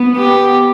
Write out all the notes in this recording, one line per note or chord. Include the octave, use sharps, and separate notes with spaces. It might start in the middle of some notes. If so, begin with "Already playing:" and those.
Already playing: B3
G4